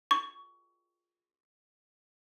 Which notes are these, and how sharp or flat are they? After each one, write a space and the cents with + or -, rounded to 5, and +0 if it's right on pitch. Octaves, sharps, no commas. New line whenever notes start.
C#6 +20